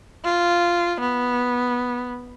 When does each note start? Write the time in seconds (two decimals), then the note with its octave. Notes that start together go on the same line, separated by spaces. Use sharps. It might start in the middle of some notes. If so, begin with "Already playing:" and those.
0.24 F4
1.00 B3